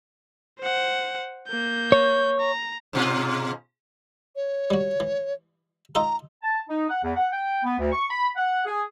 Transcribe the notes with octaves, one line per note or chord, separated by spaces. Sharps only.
C5 F#5
A#3 G6
C#5
A#5
G#2 B2 F4
C#5
G3 F#4
E3
D#4 F4 A4 A#5
A5
D#4
F#5
E2
F#5
G5
B3
D2
C#6
B5
F#5
G#4